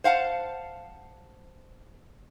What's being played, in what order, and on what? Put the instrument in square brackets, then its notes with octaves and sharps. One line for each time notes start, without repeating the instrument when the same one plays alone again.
[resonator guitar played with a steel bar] C5 F5 F#5 A5